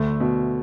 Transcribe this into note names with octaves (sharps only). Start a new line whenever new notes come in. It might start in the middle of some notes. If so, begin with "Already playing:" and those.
Already playing: D2 D3 A3
B2